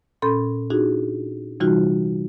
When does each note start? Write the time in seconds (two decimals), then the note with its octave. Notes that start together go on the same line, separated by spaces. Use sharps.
0.22 A#2 C#4 A4 B5 C6 G6
0.70 D4 D#4 F4 F#4 G#4
1.60 C3 E3 G3 D#4 F4 F#4